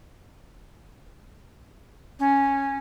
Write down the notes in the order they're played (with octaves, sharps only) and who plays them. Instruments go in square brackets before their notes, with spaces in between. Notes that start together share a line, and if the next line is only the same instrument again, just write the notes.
[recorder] C#4